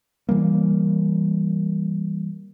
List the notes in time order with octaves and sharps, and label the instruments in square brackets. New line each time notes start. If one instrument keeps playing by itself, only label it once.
[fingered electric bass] E3 G3 A#3